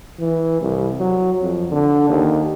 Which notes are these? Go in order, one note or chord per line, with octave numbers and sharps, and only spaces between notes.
E3
C2
F#3
F2
D3
D#2